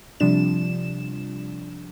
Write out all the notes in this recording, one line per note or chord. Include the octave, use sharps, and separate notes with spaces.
C3 F3 G3 D4 E7